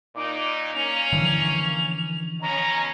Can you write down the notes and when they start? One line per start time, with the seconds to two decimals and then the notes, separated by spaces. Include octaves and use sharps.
0.16 A#2 D#4 D6
0.74 A#3 C#4 F7
1.13 D3 E3 F3
2.41 B2 C#4 A#5